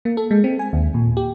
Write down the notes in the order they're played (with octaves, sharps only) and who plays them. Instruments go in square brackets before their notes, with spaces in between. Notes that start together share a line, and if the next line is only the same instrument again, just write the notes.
[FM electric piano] A#3
A4
G#3
C4
G#5
D#2
A#2
G4